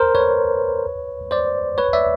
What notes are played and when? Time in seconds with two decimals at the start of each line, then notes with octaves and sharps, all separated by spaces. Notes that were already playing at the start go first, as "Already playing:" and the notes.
Already playing: A#4 C5
0.15 B4 C#5
1.31 C5 D5
1.78 B4 C#5
1.93 D5 E5